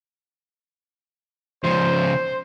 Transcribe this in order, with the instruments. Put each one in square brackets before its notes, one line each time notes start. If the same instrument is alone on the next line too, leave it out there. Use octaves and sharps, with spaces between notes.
[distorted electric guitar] C#3 F3 [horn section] C5